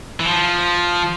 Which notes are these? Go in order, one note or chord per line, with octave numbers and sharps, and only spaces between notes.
E3
F3